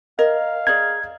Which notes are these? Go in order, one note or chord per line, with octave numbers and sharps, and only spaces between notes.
A#4 D#5 F5
G#4 D5 A#5 G#6